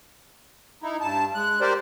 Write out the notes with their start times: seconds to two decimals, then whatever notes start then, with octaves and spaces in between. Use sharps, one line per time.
0.83 D#4 E4
1.01 G2 A5
1.34 G#3 F#6
1.61 G4 A#4 C5 D5